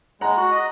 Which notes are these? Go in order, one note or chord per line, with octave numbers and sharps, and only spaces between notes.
G#3 F#5 A#5
F#4
D#5